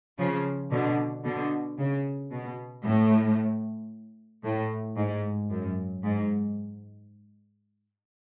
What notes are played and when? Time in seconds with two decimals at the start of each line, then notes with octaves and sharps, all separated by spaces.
0.18 C#3 F3
0.71 B2 D3
1.24 B2 D3
1.78 C#3
2.31 B2
2.84 A2
4.44 A2
4.97 G#2
5.50 F#2
6.03 G#2